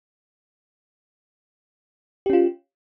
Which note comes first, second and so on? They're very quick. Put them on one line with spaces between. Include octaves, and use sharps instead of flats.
G4 C#4 F4